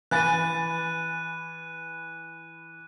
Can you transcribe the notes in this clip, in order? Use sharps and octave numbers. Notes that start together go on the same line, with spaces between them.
E3 B4 E5 G#5 B5 F#6 A6 D#7